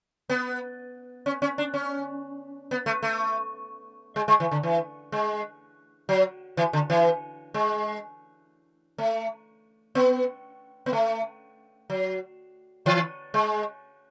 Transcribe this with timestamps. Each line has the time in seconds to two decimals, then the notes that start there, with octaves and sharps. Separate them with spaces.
0.30 B3
1.26 C#4
1.42 C#4
1.58 D4
1.74 C#4
2.71 B3
2.86 A3
3.03 A3
4.16 G#3
4.28 G#3
4.40 E3
4.51 D3
4.63 E3
5.12 G#3
6.09 F#3
6.57 E3
6.73 D3
6.90 E3
7.54 G#3
8.98 A3
9.95 B3
10.86 B3
10.93 A3
11.90 F#3
12.86 E3
13.34 G#3